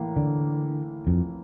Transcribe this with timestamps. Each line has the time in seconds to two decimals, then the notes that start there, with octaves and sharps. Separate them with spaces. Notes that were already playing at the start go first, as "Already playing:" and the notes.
Already playing: A2 E3 A#3
0.17 D3
1.07 F2